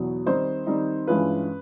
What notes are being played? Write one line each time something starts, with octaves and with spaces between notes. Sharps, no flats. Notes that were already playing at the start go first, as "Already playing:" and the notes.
Already playing: E2 B2 F#3
D#3 G3 C4 D#4 C5
D#3 G3 C4 D#4
G2 E3 G#3 C#4 F4 B4